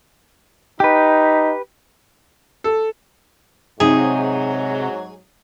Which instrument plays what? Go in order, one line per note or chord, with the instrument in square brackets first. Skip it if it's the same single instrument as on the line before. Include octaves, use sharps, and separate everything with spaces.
[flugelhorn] D#4 [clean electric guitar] G4 B4
[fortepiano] A4
[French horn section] G#2 F#3 [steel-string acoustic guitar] C3 D#4 [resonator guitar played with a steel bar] G#4